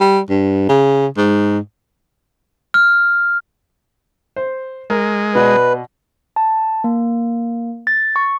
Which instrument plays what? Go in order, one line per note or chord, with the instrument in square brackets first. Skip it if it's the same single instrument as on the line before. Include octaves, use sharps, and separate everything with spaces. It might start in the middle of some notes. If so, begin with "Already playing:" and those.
[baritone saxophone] G3
G2
C#3
G#2
[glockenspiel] F6
[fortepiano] C5
[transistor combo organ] G#3 [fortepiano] A#4
[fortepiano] B2 D5 D#5 [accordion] B4
[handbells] A5
A#3
A6
C#6